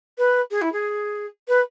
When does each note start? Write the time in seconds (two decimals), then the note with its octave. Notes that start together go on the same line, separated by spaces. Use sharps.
0.18 B4
0.51 G#4
0.61 E4
0.73 G#4
1.48 B4